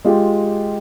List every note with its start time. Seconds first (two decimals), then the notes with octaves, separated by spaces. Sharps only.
0.05 G#3 F4 G4